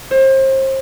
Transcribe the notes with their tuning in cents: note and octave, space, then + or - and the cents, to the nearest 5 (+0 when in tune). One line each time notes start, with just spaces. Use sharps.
C5 +35